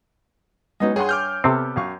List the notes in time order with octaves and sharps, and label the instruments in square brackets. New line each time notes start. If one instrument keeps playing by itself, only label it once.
[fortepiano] F#3 D#4 D#5 [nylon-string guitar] G#3 B3 C#4
[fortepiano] G2 C6 [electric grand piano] G#4 F#5 [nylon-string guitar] C#5 G#5
[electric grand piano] D6 F6 G6
[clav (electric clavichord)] C3 C4 [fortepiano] B3 G4 A4
[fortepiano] F#2 F5 C#6